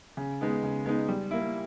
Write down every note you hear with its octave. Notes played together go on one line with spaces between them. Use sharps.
C#3
G#3 B3 D#4
C#3
G#3 B3 D#4
G3
A#3 E4